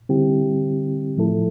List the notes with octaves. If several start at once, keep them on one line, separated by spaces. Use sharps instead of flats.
D3 G3 C4 E4 G4
A2 F3 A3 E4 A4